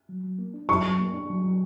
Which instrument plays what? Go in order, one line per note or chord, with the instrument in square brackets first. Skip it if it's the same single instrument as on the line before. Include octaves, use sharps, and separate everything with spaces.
[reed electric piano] F#3
F#3
A#3
D4
[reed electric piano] F#3 [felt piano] C#6
[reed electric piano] F#3
A#3
D4
F#3
F#3